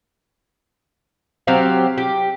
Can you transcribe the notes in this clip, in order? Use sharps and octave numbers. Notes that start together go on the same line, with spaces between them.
F#3 C4 G4 F5
G4